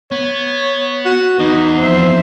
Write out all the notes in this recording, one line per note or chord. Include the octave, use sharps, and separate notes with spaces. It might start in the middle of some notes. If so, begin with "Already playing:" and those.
B3 C#5
F#4
E2 D#4 B4
F2 C5 E5